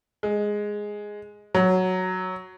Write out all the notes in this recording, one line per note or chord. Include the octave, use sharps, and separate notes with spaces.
G#3
F#3